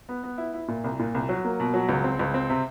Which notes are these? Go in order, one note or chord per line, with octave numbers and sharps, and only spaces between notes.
B3
B3
E4
E4
A#2
C2
A#2
C2
F#3
A#3
B2
F#3
C#2
C4
C#2
C4
C3